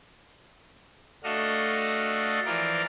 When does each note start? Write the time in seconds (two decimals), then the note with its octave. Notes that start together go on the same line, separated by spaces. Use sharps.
1.24 A3 D4 F#4 A4 D#5 F5
2.46 E3 F3 F4 A#4 D5